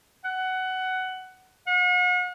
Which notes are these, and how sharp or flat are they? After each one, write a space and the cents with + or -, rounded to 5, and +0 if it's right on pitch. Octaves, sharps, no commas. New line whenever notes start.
F#5 +15
F#5 -40